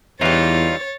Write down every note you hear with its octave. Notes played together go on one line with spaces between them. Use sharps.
E2 E3 G3 D#4 F4 C#5 A6